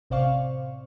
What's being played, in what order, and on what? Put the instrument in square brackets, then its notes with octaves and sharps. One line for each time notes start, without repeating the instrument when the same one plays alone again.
[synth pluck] A1 C3 C5 D5 F5 C#6